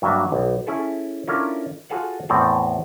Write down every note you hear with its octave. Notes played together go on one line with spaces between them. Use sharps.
G2 F#3 A#3 D4 F#4 E5
B1
C#4 E4 G#4 A4
C#4 D4 E4 F4 A4 A#4
F4 F#4 G#4 A4 F5 F#5
E2 A2 C4 A4 D5 F5